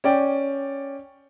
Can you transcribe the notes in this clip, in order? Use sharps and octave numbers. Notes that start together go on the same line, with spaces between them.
C#4 D5 G5